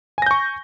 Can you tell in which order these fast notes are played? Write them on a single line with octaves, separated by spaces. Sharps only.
G#5 A#6 G6 C#6